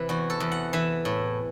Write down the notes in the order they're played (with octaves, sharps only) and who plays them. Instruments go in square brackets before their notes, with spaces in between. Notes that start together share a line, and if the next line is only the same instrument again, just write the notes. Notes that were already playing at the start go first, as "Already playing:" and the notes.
Already playing: [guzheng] C3 E3 B4
E2 F#4
A4
E2
F#5
E3 E5
A2